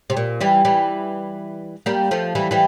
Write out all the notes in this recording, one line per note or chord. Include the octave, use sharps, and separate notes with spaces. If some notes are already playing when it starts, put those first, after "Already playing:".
C3
A#2
E3 G3
E3 G3
G3 A#3
F3 A3
E3 G3
E3 G3